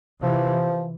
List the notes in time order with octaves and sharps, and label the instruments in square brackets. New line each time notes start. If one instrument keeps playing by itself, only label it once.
[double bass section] C3 E3 [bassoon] F3